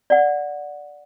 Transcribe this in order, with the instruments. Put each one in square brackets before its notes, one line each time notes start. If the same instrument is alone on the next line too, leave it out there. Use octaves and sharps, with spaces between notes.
[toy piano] D5 F#5